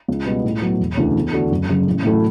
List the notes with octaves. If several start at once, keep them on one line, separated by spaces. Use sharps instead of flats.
C#2
B2 G3 B3
A2
F#3 B3
E1
D2 C#3 E3
E2
D3 A3 D4 F#4
F#1
F#2 C#3
A1
A2 F#3 A3 E4